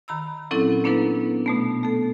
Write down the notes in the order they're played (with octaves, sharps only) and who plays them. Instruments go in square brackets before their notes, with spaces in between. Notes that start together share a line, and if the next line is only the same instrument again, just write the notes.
[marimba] D#3 A#5 B5 E6
A#2 F#3 C4 C#4 E4 A4
A#3 B3 D4 E4 A4 B4
B2 A3 B3
A3 A4